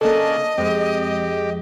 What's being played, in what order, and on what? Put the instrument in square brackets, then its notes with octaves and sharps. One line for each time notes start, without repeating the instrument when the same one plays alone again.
[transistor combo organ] C#3 D4 [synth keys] A#3 A4 [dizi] D#5
[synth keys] F2 G#3 [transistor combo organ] G4